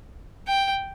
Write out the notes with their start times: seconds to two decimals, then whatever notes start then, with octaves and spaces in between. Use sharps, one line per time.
0.47 G5